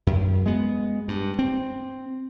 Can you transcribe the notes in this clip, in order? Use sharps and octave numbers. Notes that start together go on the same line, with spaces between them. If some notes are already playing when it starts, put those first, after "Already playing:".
F#2
G#3 B3
G2
C4